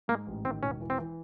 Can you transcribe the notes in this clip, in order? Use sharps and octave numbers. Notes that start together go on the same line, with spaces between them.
G#2 A#3
A1
D#3 C4
E1 C#4
E3
C4
E3